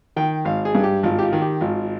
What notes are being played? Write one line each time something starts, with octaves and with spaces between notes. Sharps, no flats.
D#3 G5
G#1 F5
G#4
G2
G4
G#1 F4
G4
F4
D#3
G4
G#1 F4